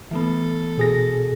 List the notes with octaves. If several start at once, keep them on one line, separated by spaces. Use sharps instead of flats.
E3 A3 B3 A4
B2 G#4 A#6